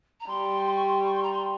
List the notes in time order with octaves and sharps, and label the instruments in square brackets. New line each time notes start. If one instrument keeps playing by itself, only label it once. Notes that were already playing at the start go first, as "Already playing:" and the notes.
[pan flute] A#5
[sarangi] G3 [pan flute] C6
[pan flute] C6
C#6
C6
C#6
C6
A#5
C6